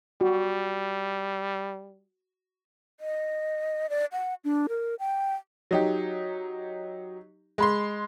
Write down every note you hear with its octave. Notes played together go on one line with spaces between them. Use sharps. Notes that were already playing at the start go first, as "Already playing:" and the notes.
G3 F#4
D#5
D5
F#5
D4
A#4
G5
F#3 D#4 G4
G#3 B5 C6